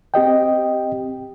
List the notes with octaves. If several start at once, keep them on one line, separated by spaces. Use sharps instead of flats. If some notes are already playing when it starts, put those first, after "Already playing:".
C4 G4 D#5 G5